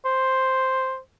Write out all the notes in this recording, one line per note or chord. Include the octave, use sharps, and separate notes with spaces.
C5